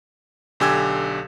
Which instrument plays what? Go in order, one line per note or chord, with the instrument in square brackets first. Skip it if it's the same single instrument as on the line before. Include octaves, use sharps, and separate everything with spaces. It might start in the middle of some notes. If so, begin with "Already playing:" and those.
[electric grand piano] B1 D3 G4 G#5 E6 G#6